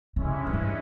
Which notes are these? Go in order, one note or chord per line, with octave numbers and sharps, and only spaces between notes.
G2 C#3 E3 G#3 C#4 E4
G2
G#2